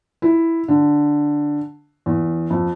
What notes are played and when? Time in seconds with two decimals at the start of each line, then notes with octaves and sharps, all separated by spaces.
0.22 E4
0.68 D3
2.06 E2
2.50 F2